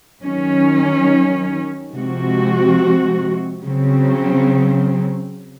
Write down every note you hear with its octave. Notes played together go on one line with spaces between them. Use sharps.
D#3 F#3 C#4
C3 F3 G#3 C4 F#4
C#3 F#3 C4